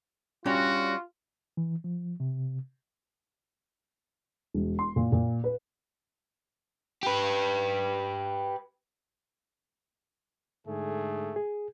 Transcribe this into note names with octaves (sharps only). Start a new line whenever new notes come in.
G3 C#4 D4 F4 F#4
E3
F3
C3
E1
C6
A#2
A#2
B4
G4 B4
G#2 D3 A3 G#4
G#4